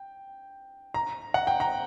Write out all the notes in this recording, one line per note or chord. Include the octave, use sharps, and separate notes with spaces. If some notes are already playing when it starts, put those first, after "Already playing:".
Already playing: G5
A#5
F#5
G5
A#5